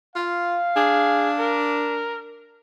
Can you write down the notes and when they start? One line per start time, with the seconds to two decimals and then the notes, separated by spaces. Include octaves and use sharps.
0.16 F4 F5
0.76 D4 G#4
1.39 A#4